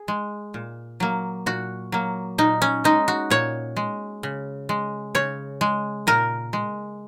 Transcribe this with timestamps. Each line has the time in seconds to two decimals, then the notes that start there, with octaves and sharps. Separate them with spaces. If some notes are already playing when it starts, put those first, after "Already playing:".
Already playing: G#4
0.08 G#3
0.54 A#2
1.00 F#3 A#3
1.46 A#2 F#4
1.92 F#3 A#3
2.38 A#2 D#4
2.62 C#4
2.84 G#3 D#4
3.08 F#4
3.30 A#2 C#5
3.76 G#3
4.23 C#3
4.69 G#3
5.15 C#3 C#5
5.61 G#3
6.07 A#2 A#4
6.53 G#3